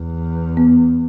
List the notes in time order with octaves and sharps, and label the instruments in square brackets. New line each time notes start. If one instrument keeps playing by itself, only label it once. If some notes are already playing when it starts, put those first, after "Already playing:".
Already playing: [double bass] E2
[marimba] B3